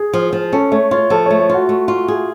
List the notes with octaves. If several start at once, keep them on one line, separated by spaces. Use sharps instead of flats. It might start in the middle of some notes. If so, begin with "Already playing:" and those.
Already playing: G#4
F3
F3
C#4 A4
A3 C#5
F4 C#5
F3 A4
C#5
A3
C#5
F4 F#4
A3
F4
G#4